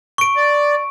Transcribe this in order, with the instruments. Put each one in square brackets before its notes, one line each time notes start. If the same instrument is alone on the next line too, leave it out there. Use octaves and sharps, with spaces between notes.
[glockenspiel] C#6 D7
[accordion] D5